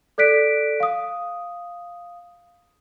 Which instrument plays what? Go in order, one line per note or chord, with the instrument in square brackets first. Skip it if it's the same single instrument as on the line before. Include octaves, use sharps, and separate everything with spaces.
[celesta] A4 D5 F#6 B6 D7
F5 D#6